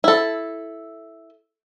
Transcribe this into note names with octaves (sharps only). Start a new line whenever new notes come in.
E4 A4